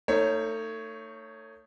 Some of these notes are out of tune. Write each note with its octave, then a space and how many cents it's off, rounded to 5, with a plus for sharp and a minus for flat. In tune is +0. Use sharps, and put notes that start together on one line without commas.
A3 +35 D#4 +0 C#5 +0